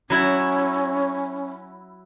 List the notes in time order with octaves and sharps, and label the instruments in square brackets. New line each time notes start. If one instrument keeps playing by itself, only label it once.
[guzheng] F#3 E4 [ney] C#4